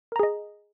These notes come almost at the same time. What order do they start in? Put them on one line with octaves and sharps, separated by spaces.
A#4 A#5 G#4 D#5